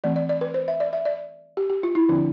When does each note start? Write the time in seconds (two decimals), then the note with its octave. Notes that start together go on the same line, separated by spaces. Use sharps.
0.04 E3 A3 C4 D5
0.16 D5
0.29 D5
0.41 B4
0.54 C5
0.68 E5
0.80 D5
0.93 E5
1.05 D5
1.57 G4
1.70 G4
1.83 F4
1.95 E4
2.09 D3 F3 C4 D4